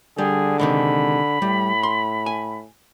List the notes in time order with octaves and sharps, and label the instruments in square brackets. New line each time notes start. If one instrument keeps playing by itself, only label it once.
[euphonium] D3 [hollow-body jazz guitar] G3 [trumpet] G#4
[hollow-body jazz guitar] C3 D#3 G#3 [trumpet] B5
[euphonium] A2 [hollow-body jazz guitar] G3
[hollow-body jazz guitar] C6
G#5